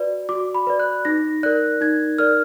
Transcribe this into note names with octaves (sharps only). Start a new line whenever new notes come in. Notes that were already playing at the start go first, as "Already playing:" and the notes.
Already playing: F#4 B4 D5
F#4 D6
B5
B4 D5
F#6
D#4 A#6
A#4 D5 F#6
D#4 G#6
A#4 D5 F6